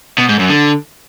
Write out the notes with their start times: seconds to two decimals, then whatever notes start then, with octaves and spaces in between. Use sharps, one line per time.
0.18 B2
0.29 G#2
0.39 F#2
0.50 D3